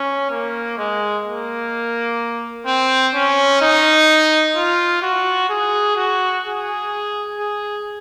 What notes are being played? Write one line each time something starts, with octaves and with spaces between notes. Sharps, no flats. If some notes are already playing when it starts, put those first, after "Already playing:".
Already playing: C#4
A#3
G#3
A#3
C4
C#4
D#4
F4
F#4
G#4
F#4
G#4
G#4